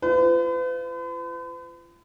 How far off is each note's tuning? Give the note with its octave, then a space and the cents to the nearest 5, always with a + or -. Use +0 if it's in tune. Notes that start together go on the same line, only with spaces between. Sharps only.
F4 -35 B4 +45